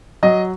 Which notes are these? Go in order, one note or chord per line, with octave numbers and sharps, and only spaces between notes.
F#3 D#5